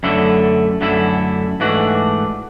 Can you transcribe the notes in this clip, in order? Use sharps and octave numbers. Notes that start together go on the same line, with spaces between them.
F#2 D3 A3 E4
F#2 D3 A3 E4
G#2 E3 A3 D4 F#4